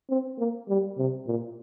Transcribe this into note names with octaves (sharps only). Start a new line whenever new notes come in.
C4
A#3
G3
C3
A#2